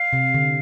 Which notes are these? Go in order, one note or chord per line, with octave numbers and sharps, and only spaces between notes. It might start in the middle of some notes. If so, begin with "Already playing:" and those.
Already playing: F5
C3
D3